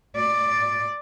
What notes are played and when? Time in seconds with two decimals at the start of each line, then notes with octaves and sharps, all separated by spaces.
0.16 D5